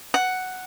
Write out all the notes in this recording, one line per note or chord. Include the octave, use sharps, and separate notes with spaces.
F#5